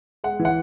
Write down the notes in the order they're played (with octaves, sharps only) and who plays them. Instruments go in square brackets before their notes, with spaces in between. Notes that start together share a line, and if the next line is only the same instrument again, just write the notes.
[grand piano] G#3 F#5
E3
F#5